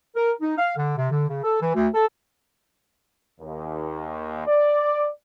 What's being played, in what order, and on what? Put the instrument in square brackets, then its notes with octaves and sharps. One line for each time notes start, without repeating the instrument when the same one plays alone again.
[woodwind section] A#4
D#4
F5
D3
C3
D3
C#3
A4
E3
D2
A4
[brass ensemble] D#2
D5